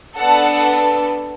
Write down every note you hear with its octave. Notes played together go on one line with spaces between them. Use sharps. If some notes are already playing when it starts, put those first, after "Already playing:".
B3 D4 A4 F#5 A5